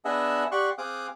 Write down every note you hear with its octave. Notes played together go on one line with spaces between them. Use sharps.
B3 D4 G#4 D#5 E5 F#5
G4 D5 F#5 C6 C#6 F#6
C4 G#4 F5 D6 D#6 F#6